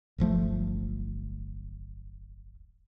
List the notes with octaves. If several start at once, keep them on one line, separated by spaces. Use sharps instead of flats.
D1 G1 F3 A3